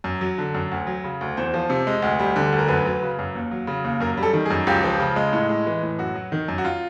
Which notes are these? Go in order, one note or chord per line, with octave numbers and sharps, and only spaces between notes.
F#2
F#3
D3
F#2
D2
F#3
C#3
D2
E2 C5
F3
C3
G#3
D2
G3
D3
D2
A#4
F#2 B4
F#3
C#3
F#2
D#2
F#3
C#3
D#2
F#2 A#4
G3
A4
D#3
G#4
F#2
C#2 G4
F3
C#3
G#3
A2
G#3
E3
A2
F#2 F#4
F#3
D#3
F#2
F#4
F4